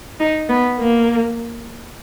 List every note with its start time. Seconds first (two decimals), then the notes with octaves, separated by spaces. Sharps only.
0.20 D#4
0.49 B3
0.79 A#3